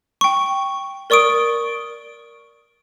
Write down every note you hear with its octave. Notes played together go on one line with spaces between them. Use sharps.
G5 C#6
A#4 D5 C#6 D#6 D7